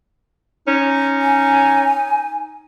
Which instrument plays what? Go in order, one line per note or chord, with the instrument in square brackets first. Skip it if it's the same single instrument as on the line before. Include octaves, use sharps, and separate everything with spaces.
[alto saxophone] C#4 [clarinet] D#4
[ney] G#5